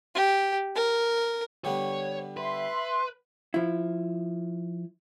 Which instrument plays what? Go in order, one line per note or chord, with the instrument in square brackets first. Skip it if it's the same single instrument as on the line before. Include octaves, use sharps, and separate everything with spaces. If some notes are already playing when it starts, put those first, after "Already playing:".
[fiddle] G4
A#4
[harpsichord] D3 G3 B3 [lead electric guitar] C#5
[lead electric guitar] B4 [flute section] E5 C6
[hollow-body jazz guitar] F3 E4